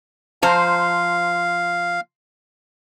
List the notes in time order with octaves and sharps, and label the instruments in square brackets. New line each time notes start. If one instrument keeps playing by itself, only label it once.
[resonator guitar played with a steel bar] F3 C5 A#5 [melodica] F5